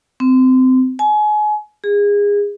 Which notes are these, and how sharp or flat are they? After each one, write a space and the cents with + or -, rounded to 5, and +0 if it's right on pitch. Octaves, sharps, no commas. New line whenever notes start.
C4 -25
G#5 +30
G#4 -25